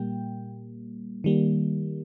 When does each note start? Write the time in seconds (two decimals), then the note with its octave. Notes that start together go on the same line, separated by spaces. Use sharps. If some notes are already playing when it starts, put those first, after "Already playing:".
Already playing: A#2 G3 A#3 G5
1.24 D#3 G3 A#3